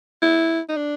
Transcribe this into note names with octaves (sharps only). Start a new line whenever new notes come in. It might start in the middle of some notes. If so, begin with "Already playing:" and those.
E4
D#4
D4